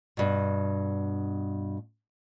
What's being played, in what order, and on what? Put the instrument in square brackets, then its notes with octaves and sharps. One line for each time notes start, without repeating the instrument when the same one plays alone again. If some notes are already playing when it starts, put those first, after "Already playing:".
[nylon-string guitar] G2 B2